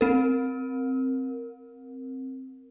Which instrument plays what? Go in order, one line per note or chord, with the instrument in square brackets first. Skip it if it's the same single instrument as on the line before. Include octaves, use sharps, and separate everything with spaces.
[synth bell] C4 A#4